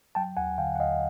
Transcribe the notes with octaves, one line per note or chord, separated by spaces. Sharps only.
F#3 G5 A5
D#2 F#5 G#5
D3 F5 G5
F#5
D#2 D#5 F5